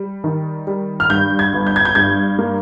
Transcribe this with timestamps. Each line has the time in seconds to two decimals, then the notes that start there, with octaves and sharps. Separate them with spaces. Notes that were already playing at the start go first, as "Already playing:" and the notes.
Already playing: G3
0.24 D#3
0.67 G3
1.00 F6
1.10 G2 G6
1.39 G#6
1.53 G1
1.67 G6
1.76 G#6
1.85 G6
1.95 G2 G#6
2.39 A#3